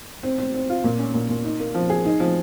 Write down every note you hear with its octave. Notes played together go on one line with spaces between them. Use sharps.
C4
C4
C4
F4
A#2
C#4
A#2
A#2
D#4
A#3
F3
G#4
D#4
F3